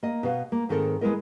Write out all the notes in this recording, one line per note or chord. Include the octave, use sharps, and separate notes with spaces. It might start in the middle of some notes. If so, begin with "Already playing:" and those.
A#3 D#5
B2 B3 F5
A#3
G#2 D#3 C4 A4 A#4
G#3 B3 E4 A#4 D#5